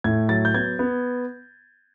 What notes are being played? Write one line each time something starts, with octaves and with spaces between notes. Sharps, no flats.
A2 G#6
F#3 A6
G6
B3 G#6
B3